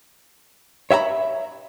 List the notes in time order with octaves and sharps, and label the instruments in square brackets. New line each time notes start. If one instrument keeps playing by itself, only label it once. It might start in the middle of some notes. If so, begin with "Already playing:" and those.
[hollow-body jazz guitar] C#5 E5 F#5 A#5 B5